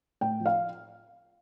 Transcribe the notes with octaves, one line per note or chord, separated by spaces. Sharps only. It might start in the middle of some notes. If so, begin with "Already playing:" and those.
A2 G5
F3
F5